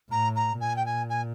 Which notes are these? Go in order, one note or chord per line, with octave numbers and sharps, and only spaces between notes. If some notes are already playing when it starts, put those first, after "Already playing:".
A2 A#5
A#5
A#2 G#5
G5
G#5
G#5